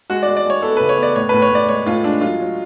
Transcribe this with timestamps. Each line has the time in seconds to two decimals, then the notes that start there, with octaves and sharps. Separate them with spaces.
0.10 G#3 F#4
0.23 D5
0.28 G#3
0.37 D5
0.46 G#3 C#5
0.62 B3 A4
0.77 C#3 B4
0.89 C#5
0.98 B3
1.03 D5
1.16 A2 C#5
1.29 A2 B4
1.42 C#5
1.51 A2 D5
1.69 G#3 C#5
1.86 A2 F4
2.04 G#3 D4
2.21 F#3 F4
2.40 F#3